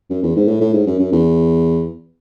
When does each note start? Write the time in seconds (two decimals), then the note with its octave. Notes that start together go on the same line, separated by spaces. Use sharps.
0.10 F#2
0.23 E2
0.36 G#2
0.48 A2
0.61 A2
0.73 G#2
0.86 F#2
0.99 F#2
1.12 E2